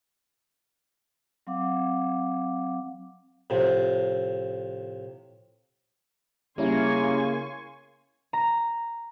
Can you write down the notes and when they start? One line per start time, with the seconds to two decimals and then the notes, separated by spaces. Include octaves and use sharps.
1.47 F#3 C4 F5 F#5 D6
3.50 A2 C3 F3
6.58 C#3 G3 A#3 C#4 E4 G#5 C6 C#6
8.33 A#5